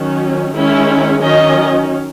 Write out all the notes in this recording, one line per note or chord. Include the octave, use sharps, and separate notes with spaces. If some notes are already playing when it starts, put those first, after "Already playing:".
Already playing: D#3 F#3 C#4
D#3 G#3 C#4 E4
D#3 F#3 C#4 D#5